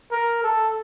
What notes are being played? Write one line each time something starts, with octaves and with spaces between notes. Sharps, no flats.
A#4
A4